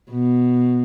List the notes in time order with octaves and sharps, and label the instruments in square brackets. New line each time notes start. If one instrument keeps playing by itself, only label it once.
[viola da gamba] B2